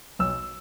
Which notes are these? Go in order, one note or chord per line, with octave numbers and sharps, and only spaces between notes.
B1 E6